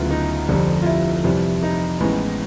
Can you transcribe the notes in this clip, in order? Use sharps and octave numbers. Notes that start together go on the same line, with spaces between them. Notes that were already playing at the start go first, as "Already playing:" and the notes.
Already playing: D2 C#3 F#3 B3 E4 F4
D#4
F1 F2 D3 G3
F4
E4
F2 C3 E3 G3
D#4
A1 A2 E3 G#3 B3